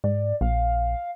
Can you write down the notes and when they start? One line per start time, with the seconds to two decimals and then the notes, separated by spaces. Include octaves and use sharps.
0.04 G#2 D5
0.41 A#1 F5